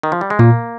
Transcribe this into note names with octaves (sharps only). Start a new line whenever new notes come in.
D#3
F3
G3
G#3
A#2 A#3